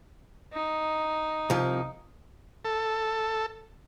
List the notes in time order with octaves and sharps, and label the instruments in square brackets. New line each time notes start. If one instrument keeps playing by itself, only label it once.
[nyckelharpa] D#4
[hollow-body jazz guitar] C2 F3
[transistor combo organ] A4